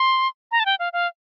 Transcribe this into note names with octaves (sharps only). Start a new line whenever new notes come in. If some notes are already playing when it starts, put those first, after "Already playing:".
Already playing: C6
A#5
A5
G5
F5
F5